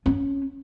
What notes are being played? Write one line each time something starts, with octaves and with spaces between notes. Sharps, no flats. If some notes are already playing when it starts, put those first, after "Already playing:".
C#4